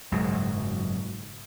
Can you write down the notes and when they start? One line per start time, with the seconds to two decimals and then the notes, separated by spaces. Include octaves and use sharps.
0.12 F#1 G#2 B2 F#3